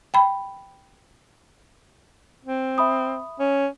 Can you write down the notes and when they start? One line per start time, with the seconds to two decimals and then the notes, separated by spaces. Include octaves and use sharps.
0.14 G5 B5
2.45 C4
2.78 E5 B5 D#6
3.40 C#4